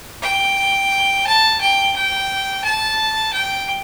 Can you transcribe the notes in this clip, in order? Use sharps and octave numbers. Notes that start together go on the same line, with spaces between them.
G5
A5
G5
G5
A5
G5